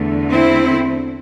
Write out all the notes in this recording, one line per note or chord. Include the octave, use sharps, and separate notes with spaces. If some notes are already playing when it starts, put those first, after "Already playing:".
Already playing: E2 D3 A3
C4 E4